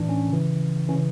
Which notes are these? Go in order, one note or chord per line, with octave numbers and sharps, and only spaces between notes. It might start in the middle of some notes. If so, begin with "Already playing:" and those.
Already playing: A2 E3 D4
C#4
C#3 E3
C#3 E3 C#4